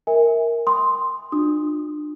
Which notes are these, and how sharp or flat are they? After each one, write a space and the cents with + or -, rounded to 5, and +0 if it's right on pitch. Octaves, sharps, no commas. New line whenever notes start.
A#4 +0 E5 -20 G#5 -20
G5 +20 C6 +0 D#6 +0
D4 +40 F4 +40 D#6 +0